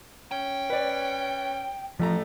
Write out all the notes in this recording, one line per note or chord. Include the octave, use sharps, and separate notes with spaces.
C#4 G5
B4 D5
A1 F3 A3 A#5